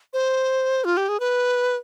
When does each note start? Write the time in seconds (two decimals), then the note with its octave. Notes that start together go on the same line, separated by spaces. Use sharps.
0.13 C5
0.85 F4
0.97 G4
1.09 G#4
1.20 B4